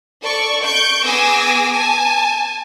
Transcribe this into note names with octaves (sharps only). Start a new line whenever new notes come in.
A4 D5 C#6
C#6 G6 D7
B3 G#4 G#5 D6 E6 A#6
G#5 A5